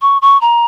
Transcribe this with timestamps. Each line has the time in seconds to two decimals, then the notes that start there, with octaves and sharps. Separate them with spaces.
0.02 C#6
0.22 C#6
0.41 A#5